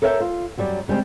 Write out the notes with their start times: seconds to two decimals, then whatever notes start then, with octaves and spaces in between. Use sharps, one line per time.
0.02 A4 A#4 C#5 E5 F5 G5
0.20 F4
0.57 F#2 F#3 G3 D5
0.88 C#3 G3 G#3 C4